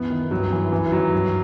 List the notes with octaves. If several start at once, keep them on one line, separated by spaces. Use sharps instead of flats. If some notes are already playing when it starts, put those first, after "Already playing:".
Already playing: F#2 E3 B3
D#3
G2 F#3
E3
F#2 E3
D#3 F#3
G2